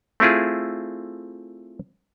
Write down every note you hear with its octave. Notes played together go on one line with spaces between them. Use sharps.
A3 C4 E4 F4 G#4